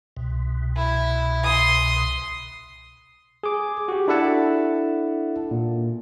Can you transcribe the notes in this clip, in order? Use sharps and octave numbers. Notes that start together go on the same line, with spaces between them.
C2 B2
E4
C6 D#6
G#4 D6
F#4 G4
D4 E4 A4 E5 F#5 A5
A#2